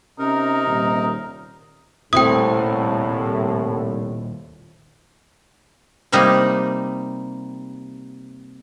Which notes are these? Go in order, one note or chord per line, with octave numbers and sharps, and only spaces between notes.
C3 C#4 D#4 A#4
D#1
D#1 C2 A2 A3 C4 E4 G5 D#6
C3 G3 A#3 D#4